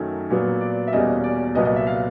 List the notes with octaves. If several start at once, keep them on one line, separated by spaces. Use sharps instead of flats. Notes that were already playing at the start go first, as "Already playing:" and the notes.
Already playing: F#2 D#3 F#3 A3 C#4
A#2 F#3 B3
D5
E5
E2 B2 G3 A#3 C#4 D#5
D5
C2 A#2 F#3 B3 D#5
D#5
E5
F5